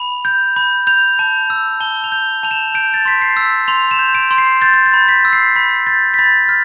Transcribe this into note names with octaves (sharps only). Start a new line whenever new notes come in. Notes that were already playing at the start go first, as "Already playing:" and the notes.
Already playing: B5 F7
G6
B5
G6 F7
A5
E6
A5 G7
F7
G6
A5 F7
E7
G6 D7
A6
C6 B6
C7
E6
C6 F7
E7
G6
D7
C6
C7
G6 A6
G6
A6
B5
B6
E6
C7
B5 B6
G6 A6
B6
B5 A6
F6